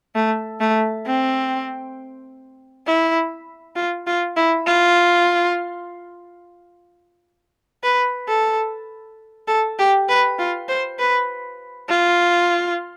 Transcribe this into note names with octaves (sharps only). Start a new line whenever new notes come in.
A3
A3
C4
E4
F4
F4
E4
F4
B4
A4
A4
G4
B4
F4
C5
B4
F4